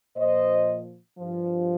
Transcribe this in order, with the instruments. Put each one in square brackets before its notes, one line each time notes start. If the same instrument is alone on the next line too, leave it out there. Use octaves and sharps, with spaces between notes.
[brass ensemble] A#2 F3 C5 D#5
G2 F3